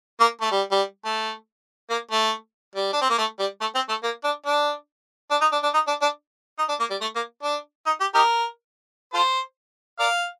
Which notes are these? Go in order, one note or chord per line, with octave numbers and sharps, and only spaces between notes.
A#3
A3
G3
G3
A3
A#3
A3
G3
D4
C4
A#3
A3
G3
A3
C4
A3
A#3
D4
D4
D4
D#4
D4
D4
D#4
D4
D4
D#4
D4
A#3
G3
A3
A#3
D4
D#4
G4
D#4 G4 A#4
F4 A4 C5
A#4 D5 F5